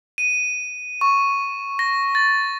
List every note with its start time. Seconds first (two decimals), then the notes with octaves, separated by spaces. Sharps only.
0.18 D#7
1.01 C#6
1.79 A#6
2.15 A6